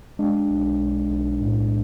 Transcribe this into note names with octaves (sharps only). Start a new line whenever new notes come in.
G#3 D4
B1
B1
B1
A2